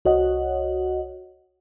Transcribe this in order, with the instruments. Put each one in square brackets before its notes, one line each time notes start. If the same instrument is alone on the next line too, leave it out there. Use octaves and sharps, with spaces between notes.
[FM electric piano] C2 F#4 C#5 D#5 F#5